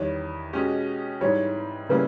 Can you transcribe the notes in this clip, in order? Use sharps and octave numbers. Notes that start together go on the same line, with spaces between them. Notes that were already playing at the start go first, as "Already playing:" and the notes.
Already playing: E2 D#3 G3 C#5
B2 G#3 C#4 G4
G#2 E3 G3 C#5
C#3 G3 A#3 C#4 E4 B4